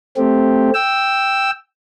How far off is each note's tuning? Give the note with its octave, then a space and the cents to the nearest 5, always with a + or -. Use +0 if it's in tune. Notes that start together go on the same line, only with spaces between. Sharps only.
A3 +0 C4 +0 G4 +0
G5 +0 E6 +0